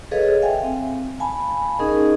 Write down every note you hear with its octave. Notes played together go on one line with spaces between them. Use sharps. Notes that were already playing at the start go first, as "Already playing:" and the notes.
G#4 A4 B4 C#5 D#5 F5
E5 F5 G5 G#5
C4
F5 G#5 A5 B5
C#4 D#4 G#4 A#4 D#5